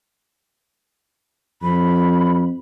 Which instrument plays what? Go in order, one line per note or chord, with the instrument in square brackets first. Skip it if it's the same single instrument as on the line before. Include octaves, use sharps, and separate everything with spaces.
[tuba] F2 [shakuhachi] B5